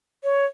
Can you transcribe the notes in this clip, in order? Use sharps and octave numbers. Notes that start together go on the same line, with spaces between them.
C#5